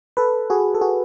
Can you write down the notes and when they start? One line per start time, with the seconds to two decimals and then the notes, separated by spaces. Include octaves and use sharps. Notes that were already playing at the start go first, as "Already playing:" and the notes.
0.17 A4 B4
0.50 F#4 G#4
0.75 A4
0.81 F#4 G#4